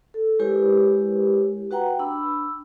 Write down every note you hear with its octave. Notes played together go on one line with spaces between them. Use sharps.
A4
G#3 E4 G4 A#4 B4 C#5
F#4 B4 F#5 G5 A#5
D4 B5 E6